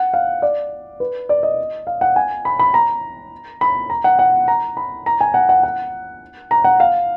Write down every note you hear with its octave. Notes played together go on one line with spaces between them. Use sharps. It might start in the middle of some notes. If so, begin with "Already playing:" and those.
Already playing: F#5
F5
D5
B4
D5
D#5
F5
F#5
G#5
B5
B5
A#5
B5
A#5
F#5
F#5
A#5
B5
A#5
G#5
F#5
F#5
F#5
A#5
F#5
F5